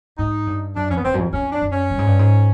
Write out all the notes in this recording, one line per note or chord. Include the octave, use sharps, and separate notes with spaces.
G#2 D#4
G2
F#2 D4
F2 C#4
B3
E2 C4
F#2
F2
F2 C#4
D4
F#2
C#4
G2
G#2
G2
G#2